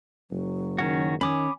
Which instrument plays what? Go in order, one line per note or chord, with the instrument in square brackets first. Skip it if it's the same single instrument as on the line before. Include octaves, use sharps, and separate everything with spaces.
[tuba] F#1 [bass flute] F#3
[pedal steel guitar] D#3 C#4 F#4
[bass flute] D#3 [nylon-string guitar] C#4 [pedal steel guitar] B5 D6 D#6